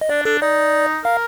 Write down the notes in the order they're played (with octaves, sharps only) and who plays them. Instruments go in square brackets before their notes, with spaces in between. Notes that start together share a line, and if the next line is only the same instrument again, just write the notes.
[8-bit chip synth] D#5
[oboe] D4 [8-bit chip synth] D5
[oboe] D4 [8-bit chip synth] A4
[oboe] D#4 [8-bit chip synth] D5
[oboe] A#4 [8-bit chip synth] F5